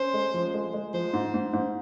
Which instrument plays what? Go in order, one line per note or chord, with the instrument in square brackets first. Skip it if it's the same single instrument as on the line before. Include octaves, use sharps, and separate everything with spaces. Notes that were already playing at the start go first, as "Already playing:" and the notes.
Already playing: [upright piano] C#4 [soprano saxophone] C5
[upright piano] G#3
F3
G#3
G#3
[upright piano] F3 [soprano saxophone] C5
[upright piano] G#2
G#2
G#2